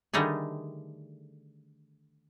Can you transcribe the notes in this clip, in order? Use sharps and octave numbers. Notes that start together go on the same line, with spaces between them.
D3 D#3 G3 A3 D#4 G#4